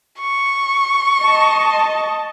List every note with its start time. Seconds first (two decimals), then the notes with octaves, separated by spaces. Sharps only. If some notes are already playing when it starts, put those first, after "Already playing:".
0.20 C#6
1.22 D#5 A5